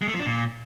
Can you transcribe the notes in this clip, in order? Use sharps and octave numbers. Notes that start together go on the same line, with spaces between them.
G#3
A3
F3
D4
A#2